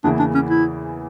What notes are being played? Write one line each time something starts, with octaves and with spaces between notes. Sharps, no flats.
E2 C#3 E3 A#3 D4
D4
C#4
E4